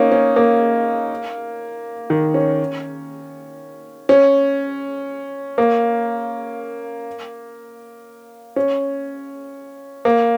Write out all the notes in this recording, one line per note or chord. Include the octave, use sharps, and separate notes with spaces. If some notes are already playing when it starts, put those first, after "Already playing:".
Already playing: A#3 C#4 D#4
C#4
A#3
D#3
C#4
C#4
A#3
C#4
A#3